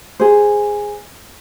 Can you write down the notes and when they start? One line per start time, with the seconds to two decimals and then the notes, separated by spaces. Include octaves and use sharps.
0.20 G#4 C5